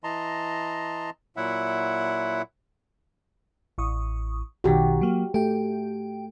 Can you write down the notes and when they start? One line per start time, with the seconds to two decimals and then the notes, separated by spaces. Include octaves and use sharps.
0.04 E3 D#5 A5 A#5 C6
1.37 A#2 F#3 E4 E5 F#5
3.78 A1 C#6 D#6
4.64 B1 B2 D#3 F#4 G4
5.01 F#3 A#3
5.34 A3 G4 G5